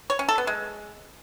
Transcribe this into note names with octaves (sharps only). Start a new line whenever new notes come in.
C#5
C#4
A4
B3
G#3